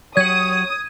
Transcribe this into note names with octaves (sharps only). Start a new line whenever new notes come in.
F#3 G4 C#5 F#5 D#6 G#6